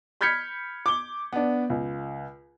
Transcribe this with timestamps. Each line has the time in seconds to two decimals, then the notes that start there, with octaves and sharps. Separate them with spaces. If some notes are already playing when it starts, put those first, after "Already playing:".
0.21 B5 F6 G6 G#6 B6 C#7
0.86 D6 G7
1.32 B3 D4
1.70 C#2